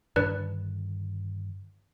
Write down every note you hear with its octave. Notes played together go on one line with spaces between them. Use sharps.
G2 D3 D#3 D4 B4 D5